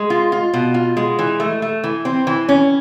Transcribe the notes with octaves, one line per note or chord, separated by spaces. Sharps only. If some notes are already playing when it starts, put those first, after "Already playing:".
Already playing: G#3
F4
F4
B2
F4
G#3
E3
A3
A3
E3
C4
E3
C#4